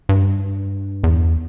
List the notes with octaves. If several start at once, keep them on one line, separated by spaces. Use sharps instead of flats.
G2
E2